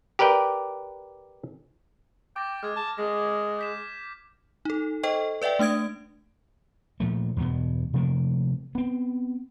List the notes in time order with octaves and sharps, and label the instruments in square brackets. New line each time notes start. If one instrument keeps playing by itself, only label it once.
[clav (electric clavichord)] G4 A#4 B4 D5 G5
[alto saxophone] G5 [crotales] D6 A6 A#6
[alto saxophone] G#3 [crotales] F6 G#6
[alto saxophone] A5
[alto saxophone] G#3 [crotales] A#6
[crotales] G6 B6 E7
[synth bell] D#4 A4
A4 C5 D#5 G5 C#6
B4 D5 E5 F#5 G5
A3 D4 D#6 G#6 D7
[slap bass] A#2 F3 A3
E2 G2 B2
C3 F3 A3 A#3
B3 C4